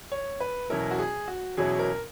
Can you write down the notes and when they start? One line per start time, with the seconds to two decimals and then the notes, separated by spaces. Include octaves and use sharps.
0.12 C#5
0.40 B4
0.70 E2 B2 F#3 C#4 E4 A#4
0.91 F#4
0.99 G#4
1.28 F#4
1.57 E2 B2 F#3 C#4 E4 G#4
1.79 A#4